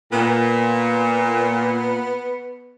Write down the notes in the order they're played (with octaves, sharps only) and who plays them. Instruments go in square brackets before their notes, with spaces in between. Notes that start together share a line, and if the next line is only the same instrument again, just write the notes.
[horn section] A#2 [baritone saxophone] B3